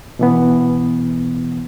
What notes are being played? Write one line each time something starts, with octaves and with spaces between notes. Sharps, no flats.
B2 E3 B3